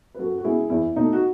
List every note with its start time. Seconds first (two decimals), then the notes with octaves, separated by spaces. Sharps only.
0.15 B4
0.19 F#2 F#4 A4
0.38 F#4
0.44 C#3 G#3 B3 E4 G#4
0.70 E2 E4
0.96 B2 A3 D#4
1.13 F#4